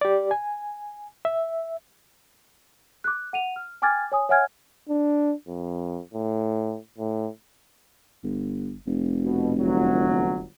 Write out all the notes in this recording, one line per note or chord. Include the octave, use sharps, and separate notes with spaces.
G4 D5
G#5
E5
D6 F#6
F#5 D#7 F7
F6
G5 G#5 D6 F6 G#6 A6
C#5 G#5 D#6
C#5 E5 F#5 G#5 F6 G#6
D4
F2
A2
A2
G1
F1
B2
G1 E2 F#3